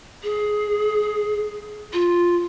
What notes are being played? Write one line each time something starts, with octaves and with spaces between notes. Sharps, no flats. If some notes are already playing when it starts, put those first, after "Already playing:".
G#4
F4